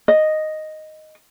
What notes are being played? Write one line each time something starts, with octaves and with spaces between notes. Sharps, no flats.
D#5